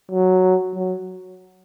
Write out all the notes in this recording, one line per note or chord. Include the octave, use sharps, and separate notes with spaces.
F#3
F#3